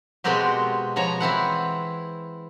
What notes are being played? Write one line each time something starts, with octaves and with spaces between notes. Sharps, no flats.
B2 G#3 A#3 C4 F#4 G4
B2 F3 C#5 A#5
E3 C4 E4 F#5